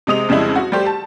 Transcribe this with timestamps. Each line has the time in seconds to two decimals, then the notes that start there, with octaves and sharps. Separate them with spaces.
0.07 C3 G#3 D#6 F7
0.29 F2 C#3 G3 G#3 E4
0.56 F#4
0.72 G3 A3 G4 C5
0.86 A5